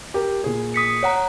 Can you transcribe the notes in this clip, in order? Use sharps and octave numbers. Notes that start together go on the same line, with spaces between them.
G4 A#4
A#2 G#4
D#6 B6 C#7
C#5 F#5 A#5